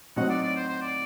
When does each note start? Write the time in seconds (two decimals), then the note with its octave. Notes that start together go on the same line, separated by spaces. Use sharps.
0.16 A2 F#3 C4 D#4 F#4 F#5
0.30 D5
0.43 D5
0.56 C5
0.69 C5
0.82 D5